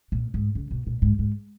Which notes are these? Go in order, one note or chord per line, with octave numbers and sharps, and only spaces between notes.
A#2
G#2
C#3
B2
A#2
G#2
G#2